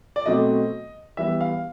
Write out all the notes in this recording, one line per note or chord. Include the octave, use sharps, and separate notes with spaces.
D5
B2 F#3 A3 C4 D#5
E3 G3 B3 E5
F5